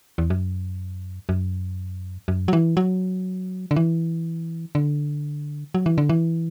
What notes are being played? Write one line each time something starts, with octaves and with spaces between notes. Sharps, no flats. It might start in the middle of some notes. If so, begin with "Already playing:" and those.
E2
F#2
F#2
F#2
F#3
E3
F#3
D3
E3
D3
F#3
E3
D3
E3